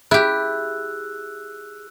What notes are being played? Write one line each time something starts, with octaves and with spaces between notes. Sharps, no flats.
E4 G4 G#4 E6 F#6